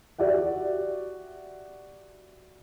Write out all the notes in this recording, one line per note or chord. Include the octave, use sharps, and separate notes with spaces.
F#4 G4 D5 E5 F#5